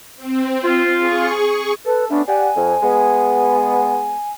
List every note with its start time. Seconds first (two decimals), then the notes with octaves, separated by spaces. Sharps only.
0.16 C4
0.64 F4
0.98 G#4 C#6
1.86 A4 B4
2.10 A3 B3 C#4 D4
2.27 G4 D5 F#5 G#5
2.56 F2
2.83 G#3 B3